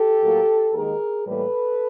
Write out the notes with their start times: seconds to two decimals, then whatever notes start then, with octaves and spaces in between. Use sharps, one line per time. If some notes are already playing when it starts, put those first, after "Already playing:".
Already playing: G4 A4
0.21 A2 F#3 A#3
0.74 D#2 D#3 G#3 G#4 A#4
1.27 A2 E3 G3 A#3 A4 B4